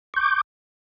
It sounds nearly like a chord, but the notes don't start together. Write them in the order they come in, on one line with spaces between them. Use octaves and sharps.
C#6 G6 D6